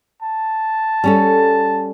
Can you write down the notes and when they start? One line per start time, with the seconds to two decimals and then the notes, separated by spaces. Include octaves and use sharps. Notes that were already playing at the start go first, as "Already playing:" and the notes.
0.23 A5
1.04 G3 C#4 A4